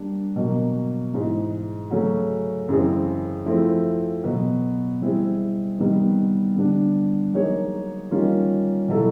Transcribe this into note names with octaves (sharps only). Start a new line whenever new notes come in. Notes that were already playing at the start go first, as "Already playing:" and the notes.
Already playing: G3 A#3 D4
B2 F#3 A#3
G#2 E3 G#3
C#3 F#3 A3 C#4 F#4
F#2 C#3 E3 G#3 C4
F3 A3 C4 E4
B2 F#3 B3
G3 C4 E4 G#4
C3 D#3 G3 B3
D3 G3 B3 D4
F#3 A#3 D#4 G#4 C#5
D#3 G3 A#3 C#4 F4
B2 F#3 B3 E4 A4